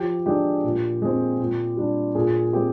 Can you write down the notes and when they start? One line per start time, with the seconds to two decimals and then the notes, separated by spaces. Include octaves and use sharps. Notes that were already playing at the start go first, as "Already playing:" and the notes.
Already playing: F3 G4
0.26 G#3 D4 G4
0.64 A#2
1.02 G#3 C4
1.39 A#2
1.77 G3 D4
2.15 A#2 G#4
2.53 G#3 C4 G4